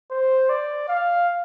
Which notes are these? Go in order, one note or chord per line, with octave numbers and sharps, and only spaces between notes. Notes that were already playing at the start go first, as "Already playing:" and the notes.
C5
D5
F5